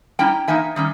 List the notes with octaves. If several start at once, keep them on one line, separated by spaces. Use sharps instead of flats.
G3 C#4 E4 G5 A#5
E3 A#3 D#4 E5 G#5
D#3 G3 C#4